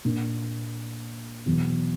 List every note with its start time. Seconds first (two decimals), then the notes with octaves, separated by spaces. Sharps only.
0.05 A#2 A#3 D4
1.46 E2 B2 F#3 B3